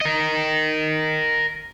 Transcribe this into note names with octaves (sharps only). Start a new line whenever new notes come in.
A#4 D#5